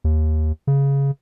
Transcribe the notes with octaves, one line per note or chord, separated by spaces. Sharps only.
D#2
C#3